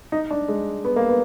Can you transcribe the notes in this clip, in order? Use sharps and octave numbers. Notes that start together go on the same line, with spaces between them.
D#4
D4
G#3
B3
A#3
B3